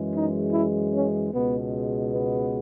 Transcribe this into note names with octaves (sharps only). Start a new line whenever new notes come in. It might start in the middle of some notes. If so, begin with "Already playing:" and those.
Already playing: F#2 E3 G#3
D#4
E4
C#4
C#2 B2 G#3 B3
B3